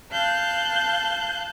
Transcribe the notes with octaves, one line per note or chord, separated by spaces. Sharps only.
F5 A5 F#6 G6